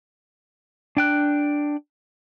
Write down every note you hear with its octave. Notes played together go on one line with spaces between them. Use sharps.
D4 G5 F#6